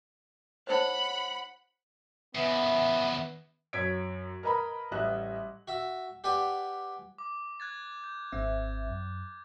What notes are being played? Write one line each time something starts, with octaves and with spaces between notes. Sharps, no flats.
D#4 C5 C#5 F#5 B5
E2 C#3 B3 E5
F#2 C#5 G#6 B6 D7
A#4 B4 D#5 A#5 B5
A1 G3 D#5 E5 F#6
F#4 E5
G4 B4 D5 F#5 G#5
D6
F#6 G#6 A6
G6
G#1 C4 E5
F#2